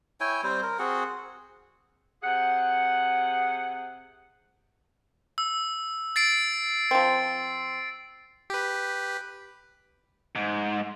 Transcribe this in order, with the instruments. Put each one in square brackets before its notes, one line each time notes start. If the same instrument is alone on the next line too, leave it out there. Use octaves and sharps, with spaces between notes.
[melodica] E4 C#5 G5 G#5
G3 C4 C5
A#4
C4 F#4 G#4 F#5
[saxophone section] C3 G#4 F#5
[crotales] E6
A6 C7 D7
[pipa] F3 C4
[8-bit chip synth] G4 B4
[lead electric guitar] G#2